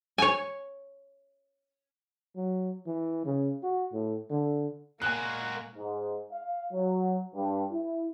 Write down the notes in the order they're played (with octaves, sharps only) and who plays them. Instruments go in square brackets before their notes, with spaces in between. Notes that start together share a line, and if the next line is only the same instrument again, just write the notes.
[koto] C#5 G#5
[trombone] F#3
E3
C#3
F#4
A2
D3
[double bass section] A#2 [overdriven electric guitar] G#3 F#4 [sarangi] A#3 [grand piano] G#5 F#6
[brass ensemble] G#2
F5
F#3
G2
E4